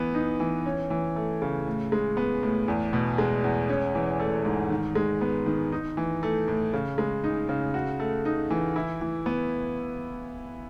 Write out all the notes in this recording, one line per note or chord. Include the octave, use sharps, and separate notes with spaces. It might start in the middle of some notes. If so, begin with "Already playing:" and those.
Already playing: E3 B3
D#4
E3
C#4
E3
A3
C#3
A2
G#3
B3
A2
E2
B2
G#3
E2
C#4
E3
A3
G#2
D#3
G#3
B3
D#3
D#4
E3
A3
A2
C#3
G#3
D#4
C#3
F#4
A3
D#4
E3
E4
E3
B3